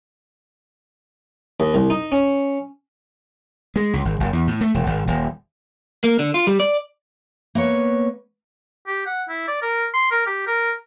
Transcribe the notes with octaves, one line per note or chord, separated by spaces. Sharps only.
D#2
C2
D#4
C#4
G#3
C#2
G#1
F#1
E2
A2
A3
E1
G#1
D#1
A#3
D3
F4
G3
D5
A#3 B3 B4 C#5
G4
F#5
E4
D5
A#4
C6
A#4
G4
A#4